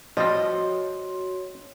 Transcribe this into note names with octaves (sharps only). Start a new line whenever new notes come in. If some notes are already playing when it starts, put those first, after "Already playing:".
F3 G3 C4 F#4 C#5 D#5 C6